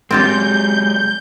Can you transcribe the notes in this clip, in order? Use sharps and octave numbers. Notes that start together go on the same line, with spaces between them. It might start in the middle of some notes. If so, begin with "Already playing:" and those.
F#3 G#3 C4 F4 G4 G6